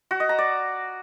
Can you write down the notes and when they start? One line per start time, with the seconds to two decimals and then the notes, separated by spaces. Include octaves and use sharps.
0.11 F#4
0.20 D#5
0.29 A#5
0.39 D5